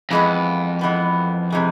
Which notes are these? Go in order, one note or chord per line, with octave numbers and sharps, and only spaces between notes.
F2 E3 G#3 B3
E3 G#3 B3
C3 E3 G#3